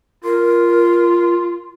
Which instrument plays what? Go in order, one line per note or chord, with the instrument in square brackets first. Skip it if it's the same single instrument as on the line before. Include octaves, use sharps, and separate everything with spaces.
[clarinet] F4 [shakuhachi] A#4